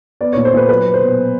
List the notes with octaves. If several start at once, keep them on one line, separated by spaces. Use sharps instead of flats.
B3 D5
A#2 C#5
C5
A#2 B4
F#3 B4
F#3
C5
B2